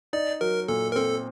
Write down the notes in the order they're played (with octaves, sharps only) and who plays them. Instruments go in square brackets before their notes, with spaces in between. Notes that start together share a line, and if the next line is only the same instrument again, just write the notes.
[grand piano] D#4 [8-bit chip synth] D5
[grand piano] F#3 [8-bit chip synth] A#4
[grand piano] A#2 [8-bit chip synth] A4
[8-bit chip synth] A#4
[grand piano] C4 [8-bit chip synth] A4